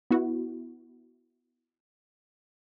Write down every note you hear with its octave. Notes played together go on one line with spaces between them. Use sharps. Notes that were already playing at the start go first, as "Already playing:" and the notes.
B3 E4 F#4